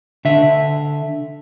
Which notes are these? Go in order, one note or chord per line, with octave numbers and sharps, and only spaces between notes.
D3 E5